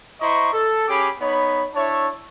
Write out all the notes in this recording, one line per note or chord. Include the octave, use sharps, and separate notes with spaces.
E4 C5 D#5 A#5 C#6
A4
C#4 G4 G#4 B5 D6
B3 D#4 C#5 B5
D4 E4 C#5 E5 A5 C#6